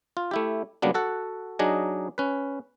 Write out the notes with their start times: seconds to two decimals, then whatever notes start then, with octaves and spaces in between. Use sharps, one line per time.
0.17 F4
0.31 A3 E4 G4
0.82 C#3 F#3 G3 A#3 B3 D4
0.94 F#4 A4 F#5
1.59 F#3 D4 D#4 G#4 D#5
2.18 C#4 B4